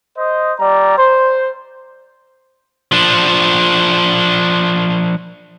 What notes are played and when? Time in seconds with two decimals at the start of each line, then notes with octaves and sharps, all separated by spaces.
0.18 C5 D#5
0.60 G3 D5 A#5
0.97 C5
2.92 F3 D4